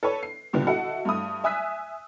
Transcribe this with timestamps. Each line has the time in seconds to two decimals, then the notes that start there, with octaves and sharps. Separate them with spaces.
0.03 A4 B4 C#5
0.23 C7
0.53 A#2 D3 G3 B3
0.67 E4 F#4 A4 D#5 F#5
1.05 G2 A3 D#6
1.44 E5 G#5 D#6 E6 F#6 B6